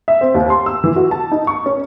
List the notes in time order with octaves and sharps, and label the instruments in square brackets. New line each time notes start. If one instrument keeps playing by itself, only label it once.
[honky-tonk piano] E5
C4
D#2
C6
E6
E3
F#4
A5
D#4
C#6
C#4